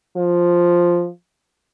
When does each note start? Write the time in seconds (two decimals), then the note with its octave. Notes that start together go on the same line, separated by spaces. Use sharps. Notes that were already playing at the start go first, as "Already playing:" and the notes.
0.17 F3